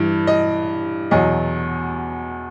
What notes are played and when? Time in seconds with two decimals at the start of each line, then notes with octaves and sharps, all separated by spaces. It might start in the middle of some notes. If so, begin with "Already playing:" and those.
Already playing: G2 E3
0.27 D#5
1.11 E2 B2 F#3 D#5